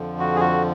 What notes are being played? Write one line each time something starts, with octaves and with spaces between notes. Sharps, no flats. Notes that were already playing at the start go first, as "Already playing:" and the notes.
Already playing: F2 D3 F3
F#4
G#4
F#4